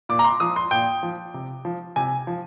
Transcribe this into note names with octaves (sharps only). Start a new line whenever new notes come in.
A#2 D6
A#5
C6
F3 D#6
C6
A#2 G5
F3
C3
F3
C3 G#5
F3